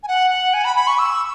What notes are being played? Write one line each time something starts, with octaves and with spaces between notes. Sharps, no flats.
G#5
F#5
F#5
G#5
B5
B5
C#6
E6